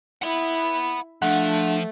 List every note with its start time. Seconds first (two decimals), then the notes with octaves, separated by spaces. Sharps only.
0.22 E4 F#5 B5
1.22 F3 A3 D4 F#5